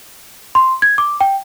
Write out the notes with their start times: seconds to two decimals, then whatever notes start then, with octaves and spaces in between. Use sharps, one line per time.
0.55 C6
0.82 G#6
0.98 D6
1.21 G5